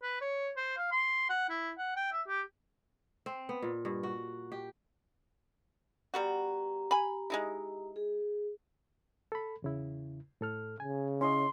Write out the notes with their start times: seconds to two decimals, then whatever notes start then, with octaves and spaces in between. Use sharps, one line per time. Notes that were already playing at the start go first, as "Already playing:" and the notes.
0.03 B4
0.21 C#5
0.57 C5
0.77 F5
0.92 C6
1.29 F#5
1.49 E4
1.78 F#5
1.96 G5
2.13 E5
2.28 G4
3.26 C4
3.49 B3
3.62 A#2
3.85 G2
4.03 F#4
4.52 G4
6.14 G3 B3 F#4 G4 A#5
6.91 G#5 B5
7.30 G#3 D#4 E4
7.96 G#4
9.32 A4 B5
9.62 E2 C#3 E4
10.41 A2 A4 F6
10.80 C#3 G#5
11.21 C#4 E4 D#5 C6